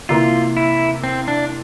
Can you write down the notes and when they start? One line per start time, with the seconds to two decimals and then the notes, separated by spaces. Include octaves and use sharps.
0.09 C3 E3 A#3 F4
0.57 E4
1.04 C4
1.28 D4